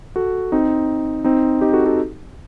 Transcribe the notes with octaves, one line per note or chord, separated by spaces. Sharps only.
F#4 A4
C4 D#4
C4 D#4
D#4 G4
F#4 A4
F#4 A4